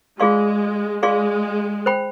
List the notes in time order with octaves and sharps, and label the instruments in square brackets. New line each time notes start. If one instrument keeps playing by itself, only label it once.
[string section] G#3 [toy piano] F4 G#4 D5 F5 C6
[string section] G#3 [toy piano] F4 G#4 D5 F5 C6
[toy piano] C5 G5 B5